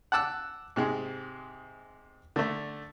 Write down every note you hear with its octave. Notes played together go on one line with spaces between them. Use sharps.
F#5 A5 D6 E6 F#6
G#2 C3 G#3
D3 A3